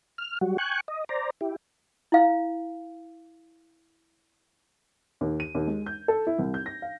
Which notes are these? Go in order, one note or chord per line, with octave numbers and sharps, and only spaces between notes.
F6
F#3 G3 F#4
G5 G#5 C#6 F#6
D#5
C5 D5 A#5
E4 G4
E4 F5
D#2
D#7
D#2
G#3
G6
A4
E4
C2
G6
A#6
F5